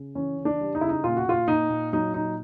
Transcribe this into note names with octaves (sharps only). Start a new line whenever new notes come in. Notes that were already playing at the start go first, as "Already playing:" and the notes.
Already playing: C#3
E3 C#4
C#3
D4
G3
D#4
C#3 E4
D#4
A#2 F4
F#4
A#2 F4
A#2 D#4
A#2
F#3 D#4
A#2 D#4